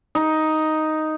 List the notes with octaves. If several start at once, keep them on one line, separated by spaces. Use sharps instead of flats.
D#4